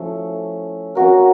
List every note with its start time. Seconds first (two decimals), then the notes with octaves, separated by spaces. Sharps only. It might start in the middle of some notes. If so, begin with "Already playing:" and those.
Already playing: F3 A3 C#4 E4
0.95 A#3 C#4 F#4 A#4